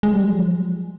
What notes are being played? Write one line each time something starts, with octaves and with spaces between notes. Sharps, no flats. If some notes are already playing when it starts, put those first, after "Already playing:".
G#3
G3
F#3
F3